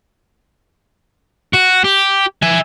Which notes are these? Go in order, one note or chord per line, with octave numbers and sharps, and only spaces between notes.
F#4
G4
E5 G#5